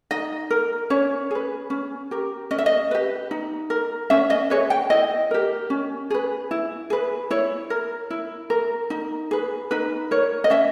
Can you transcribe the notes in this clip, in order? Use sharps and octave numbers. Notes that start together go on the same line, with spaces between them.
D#4 D#5
A#4
C#4 C#5
G#4 B4
C#4
G4 A#4
C#4 D#5
E5
D#5
G4 B4
D#4
A#4
C#4 E5
D#5
G#4 B4 C#5
G5
E4 D#5
G4 A#4
C#4
G#4 B4
E4
G#4 B4
E4 C#5
A#4
E4
A#4
D#4
G#4 B4
D#4 B4
A#4 C#5
D#5
C#4 E5